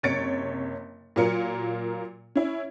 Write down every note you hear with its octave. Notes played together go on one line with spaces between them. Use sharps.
F#1 C3 C#5 A6 C#7 D7
A#2 F#3 F4 A#4 C#7
C#4 E4